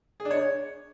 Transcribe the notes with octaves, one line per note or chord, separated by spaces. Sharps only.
G#4
D4
C#5